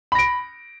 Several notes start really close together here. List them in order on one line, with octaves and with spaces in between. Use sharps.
B5 A#6 D7